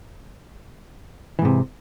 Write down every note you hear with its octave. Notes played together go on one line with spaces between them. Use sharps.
G#2 C3 E3